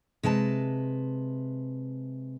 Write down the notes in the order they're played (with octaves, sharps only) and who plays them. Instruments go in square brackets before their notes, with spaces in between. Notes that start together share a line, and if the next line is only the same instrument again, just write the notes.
[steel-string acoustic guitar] C3 G#3 B4 A5